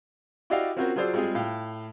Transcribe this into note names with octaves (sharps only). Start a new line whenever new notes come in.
E4 F#4 G4 D5 D#5 F5
C4 C#4 F4 F#4 A#4 C5
F#3 F4 G#4 C5 D5 E6
G3 G#3 C4 F4 G#4
A2 F5 G5